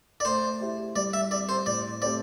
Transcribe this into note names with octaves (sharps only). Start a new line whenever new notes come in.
D5
A3 C5
E4 G4 C5
G3 D5
E5
C4 G4 D5
C5
A2 D5
A3 C4 G4 C5 D5